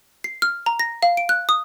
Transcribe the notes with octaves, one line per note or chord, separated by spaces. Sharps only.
C7
F6
A#5
A#6
F5
D7
F#6
D#6